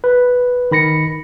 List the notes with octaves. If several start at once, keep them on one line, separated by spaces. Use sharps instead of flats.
B4
D#3 B5 A#6 C#7